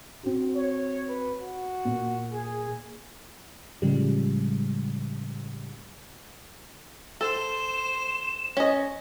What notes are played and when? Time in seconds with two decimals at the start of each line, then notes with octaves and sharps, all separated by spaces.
0.23 C4 F#4
0.56 C#5
1.08 B4
1.41 F#4
1.85 A#2
2.32 G#4
3.82 A2 C#3 F3 G3 G#3
7.21 A4 C5 E7
8.57 C#4 D#5